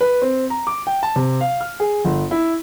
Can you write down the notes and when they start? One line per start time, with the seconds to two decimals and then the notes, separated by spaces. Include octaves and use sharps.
0.01 B4
0.22 C4
0.50 A#5
0.67 D6
0.87 G5
1.03 A5
1.16 C3
1.41 F5
1.61 F6
1.80 G#4
2.05 G1
2.31 E4